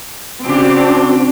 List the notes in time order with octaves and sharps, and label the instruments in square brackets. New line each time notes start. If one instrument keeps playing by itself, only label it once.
[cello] C#3 G4 [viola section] C4 D4 F#4